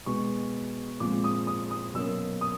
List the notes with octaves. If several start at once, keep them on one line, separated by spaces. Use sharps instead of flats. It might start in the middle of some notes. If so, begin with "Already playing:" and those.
B2 G#3 B3 C#6
A#2 F3 G#3 C4 D6
D#6
D#6
D#6
B2 F#3 A#3 C#4 E6
D#6